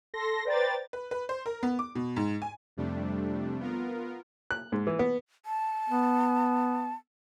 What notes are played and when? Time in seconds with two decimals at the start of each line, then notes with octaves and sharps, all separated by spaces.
0.14 A4 C6 A#6
0.45 B4 C5 D5 G5 A#5 A6
0.93 B4
1.11 B4
1.29 C5
1.46 A#4
1.63 B3
1.79 D6
1.95 B2
2.16 G#2
2.42 G#5
2.77 F2 C3 G3 A3 D4
3.60 B3 F4 A#4
4.51 F#6
4.72 G#2
4.87 E3
4.99 B3
5.46 A5
5.90 B3